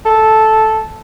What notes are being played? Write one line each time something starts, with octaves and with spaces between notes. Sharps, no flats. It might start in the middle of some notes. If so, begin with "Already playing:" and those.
A4